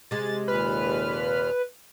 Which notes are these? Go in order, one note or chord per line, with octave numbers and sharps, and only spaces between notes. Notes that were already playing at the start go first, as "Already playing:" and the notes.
C3 G#3 A6
D#2 A#2 B4 F6